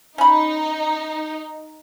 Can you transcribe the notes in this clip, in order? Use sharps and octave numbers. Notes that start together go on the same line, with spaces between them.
C#4 D#4 B5